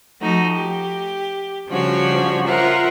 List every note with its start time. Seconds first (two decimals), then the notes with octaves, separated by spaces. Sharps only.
0.21 F3 A3 D#4 F#4
0.52 G4
1.69 C#3 F3 G3 D4 F#4 C#5
2.45 F4 A#4 C5 E5 F#5